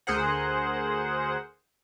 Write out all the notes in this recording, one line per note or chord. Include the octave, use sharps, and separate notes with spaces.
D2 G#4 A#4 C5 F#5